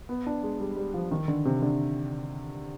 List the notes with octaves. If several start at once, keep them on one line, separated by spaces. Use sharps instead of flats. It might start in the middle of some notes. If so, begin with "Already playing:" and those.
B3
D4
G#3
G3
G3
F3
D#3
D3
C3
D3